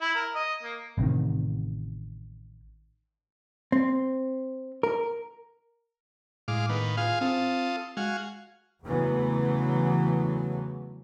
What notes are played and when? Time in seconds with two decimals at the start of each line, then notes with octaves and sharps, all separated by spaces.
0.01 E4
0.15 A#4
0.35 D#5
0.63 A#3
0.98 A1 C3 D#3
3.72 C4
4.83 A#4
6.48 A2 G#3 F5 D6
6.69 D#3 B3
6.97 F4 G#4 F5
7.21 C4 F4 A4 D#6
7.97 G#3 F#4 F5 G#5
8.84 E2 C#3 E3 F#3 A3 B3